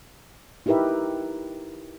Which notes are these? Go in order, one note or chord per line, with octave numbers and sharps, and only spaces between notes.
D#4 E4 G4 A#4 B4 E5